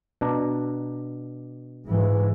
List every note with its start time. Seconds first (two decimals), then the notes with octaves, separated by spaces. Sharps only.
0.21 B2 D4 A#5
1.88 G#2 E3